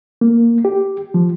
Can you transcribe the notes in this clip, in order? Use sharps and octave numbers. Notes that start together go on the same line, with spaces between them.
A#3
G4
F3